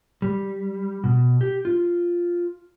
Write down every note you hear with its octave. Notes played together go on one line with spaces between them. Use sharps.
G3
B2
G4
F4